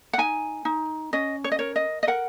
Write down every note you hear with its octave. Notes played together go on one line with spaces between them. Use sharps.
F#5
D#4 G#5
D#4
C#4 D#5
C#5
D#5
A#4 C#5
D#5
D#5
A#4 F#5